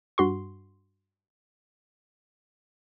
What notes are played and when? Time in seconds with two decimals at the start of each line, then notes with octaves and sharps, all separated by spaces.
0.18 G2 F#4 C6